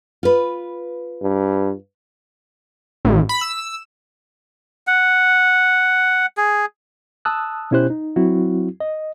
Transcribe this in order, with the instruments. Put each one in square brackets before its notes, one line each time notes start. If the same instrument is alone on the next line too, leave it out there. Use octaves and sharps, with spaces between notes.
[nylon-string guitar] F4 B4
[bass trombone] G2
[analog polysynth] A1
B5
E6
[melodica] F#5
G#4
[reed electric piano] A5 D#6 E6 F#6
B2 C#4 E4 G4 C5 F#6
D#4
F#3 C4 E4 F#4
D#5